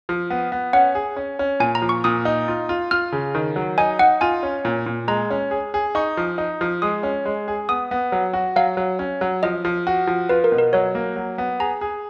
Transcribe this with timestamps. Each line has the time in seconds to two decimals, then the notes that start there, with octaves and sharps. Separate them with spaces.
0.09 F3
0.30 B3
0.52 B3
0.73 C#4 F#5
0.95 G#4
1.16 C#4
1.39 C#4
1.60 A#2 G#5
1.75 A#5
1.82 F3
1.89 C#6
2.04 A#2 D#6
2.25 D#4
2.48 F4
2.69 F4
2.91 F4 F6
3.12 C#3
3.35 D#3
3.56 F#3
3.78 D#4 G#5
3.99 D#4 F#5
4.21 F4 G#5
4.43 C#4
4.65 A#2
4.86 A#2
5.08 G#3 A#5
5.30 C#4
5.51 G#4
5.74 G#4
5.95 D#4 C#6
6.17 F3
6.38 D#4
6.61 F3
6.82 G#3 D#6
7.03 C#4
7.26 G#3
7.48 G#4
7.69 B3 D#6
7.91 B3
8.12 F#3
8.33 F#4
8.56 F#3 F5
8.77 F#3
8.99 C#4
9.21 F#3
9.43 F3 D#5
9.65 F3
9.87 F#4
10.07 F3
10.29 F4 B4
10.44 A#4
10.52 B2
10.58 A#4
10.73 F#3 C#5
10.95 A#3
11.16 F#3
11.38 B3
11.60 G#4 A#5
11.81 G#4